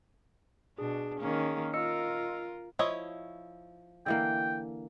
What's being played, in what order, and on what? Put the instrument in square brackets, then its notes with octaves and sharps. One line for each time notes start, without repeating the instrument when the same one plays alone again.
[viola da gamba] B2 D4 [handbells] G#4
[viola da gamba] D#3 A#3 C#4
[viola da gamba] F4 A#4 [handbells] D#5 E6 C#7
[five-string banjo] F3 C#5 D#5 [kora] E4
[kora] D3 E3 A#3 [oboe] G5